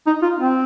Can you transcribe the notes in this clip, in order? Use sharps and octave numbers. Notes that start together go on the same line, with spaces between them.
D#4
F4
C4